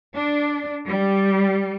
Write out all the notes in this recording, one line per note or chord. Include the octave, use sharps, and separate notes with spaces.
D4
G3